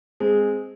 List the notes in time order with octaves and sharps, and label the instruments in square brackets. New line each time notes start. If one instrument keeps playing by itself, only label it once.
[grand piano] G#3 C4 [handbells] G#4